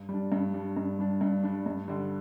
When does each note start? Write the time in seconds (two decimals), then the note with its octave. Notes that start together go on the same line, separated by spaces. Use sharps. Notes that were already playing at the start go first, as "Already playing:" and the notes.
Already playing: G2
0.09 G3 D4
0.32 G2
0.54 G3 D4
0.77 G2
0.99 G3 D4
1.21 G2
1.43 G3 D4
1.66 G2
1.88 D3 G3